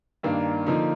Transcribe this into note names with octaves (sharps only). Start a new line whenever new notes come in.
G2 D#3 A#3 D4
D3 F3 A#3 D#4